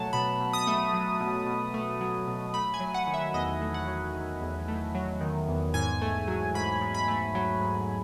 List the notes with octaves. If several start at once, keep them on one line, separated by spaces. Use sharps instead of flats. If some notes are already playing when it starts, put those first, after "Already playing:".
Already playing: B2 F#3 A3 F#5 A5
B2 B5
B2
D#6
A3
F#3
B2
B2
A3
F#3
B2
A3 B5
G#5
F#3
F#5
D#3
E5
E2 D#5
A3
F#5
F#3
D#3
E2
A3
F#3
D#3
E2
G#2 G#5
A3
F#3
G#2 B5
G#2
B5
A3
F#3
G#2